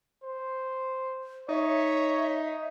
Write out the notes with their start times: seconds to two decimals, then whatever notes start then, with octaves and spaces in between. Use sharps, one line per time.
0.23 C5
1.49 D#4 C#5 E5